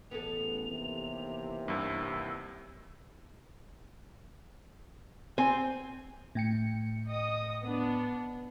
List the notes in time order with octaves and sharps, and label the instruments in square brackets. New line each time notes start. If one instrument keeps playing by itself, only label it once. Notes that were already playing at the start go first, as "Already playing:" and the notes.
[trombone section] A1 [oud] B3 G#4 A4 [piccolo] F7
[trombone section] D#2 C3 E3
[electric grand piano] C2 G2 [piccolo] E6
[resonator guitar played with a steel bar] C4 [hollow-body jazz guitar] G#5
[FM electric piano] A2 G5 C#7
[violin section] D#5 D#6
B3 D4